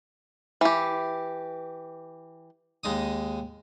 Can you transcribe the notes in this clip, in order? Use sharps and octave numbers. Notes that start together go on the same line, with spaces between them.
E3 G4
D#2 G#3 D#4 D6 D#6